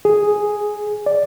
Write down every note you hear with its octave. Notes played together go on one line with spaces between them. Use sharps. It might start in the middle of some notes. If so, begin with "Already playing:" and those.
G#4
D5